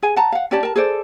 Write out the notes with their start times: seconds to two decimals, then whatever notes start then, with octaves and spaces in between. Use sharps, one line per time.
0.02 G#4 G#5
0.16 F#5 A5 A#5
0.32 F5 F#5
0.51 C#4 G4 D5 A5
0.63 A#4 A5
0.76 G#4 A4 C5 D5